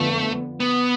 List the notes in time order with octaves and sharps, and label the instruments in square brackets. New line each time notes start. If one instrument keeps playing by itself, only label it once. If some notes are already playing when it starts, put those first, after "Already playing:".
Already playing: [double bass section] F2 D3 F3 B3 [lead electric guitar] A3
[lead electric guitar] B3